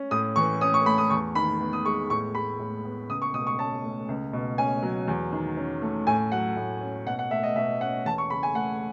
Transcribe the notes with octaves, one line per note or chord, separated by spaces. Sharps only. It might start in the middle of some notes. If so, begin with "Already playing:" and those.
Already playing: C#4
A2 D#6
E3 C#6
C#4 D#6
C#6
A3 B5
D#6
E2 C#6
D#3 B5
B3
D#6
G#3 C#6
A2 C#6
G#3 B5
A2
B3
C#2 D#6
C#6
B2 D#6
C#6
C#4 A5
A3
C#2
B2
C#4 G#5
F#3
E2
D#3
C#4
A3
A2 G#5
F#3 F#5
A2
C#4
B2 F#5
F#5
A3 E5
D#5
B2 E5
C#4 F#5
E2 A5
C#6
C#3 B5
G#5
A3 F#5